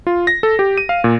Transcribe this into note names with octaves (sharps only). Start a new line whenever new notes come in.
F4
A#6
A4
G4
D#7
F5
A#2